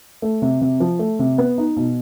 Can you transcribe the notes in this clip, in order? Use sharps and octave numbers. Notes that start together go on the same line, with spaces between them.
A3
C3
C3
F3
A3
C3
B3
D#4
B2